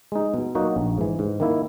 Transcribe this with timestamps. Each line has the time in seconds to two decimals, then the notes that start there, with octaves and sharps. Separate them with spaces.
0.12 G#3 D#4
0.34 B2
0.55 F#3 A#3 D#4 F#4
0.76 A#1
0.98 G#2 E3
1.19 G#2
1.40 D#3 A#3 E4